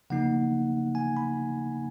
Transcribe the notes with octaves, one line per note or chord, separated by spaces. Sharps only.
C#3 F3 A#3 D#4 F#5
G#5
B5